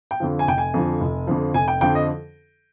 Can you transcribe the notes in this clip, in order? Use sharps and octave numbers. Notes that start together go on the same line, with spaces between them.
G5
F2 D3 F3
G#5
F1 G5
G#5
F2 D3 F3
F1
F2 D3 F3
F1 G#5
G5
F2 D3 F3 G5
D#5